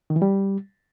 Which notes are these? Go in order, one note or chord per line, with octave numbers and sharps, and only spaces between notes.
D#3
E3
G3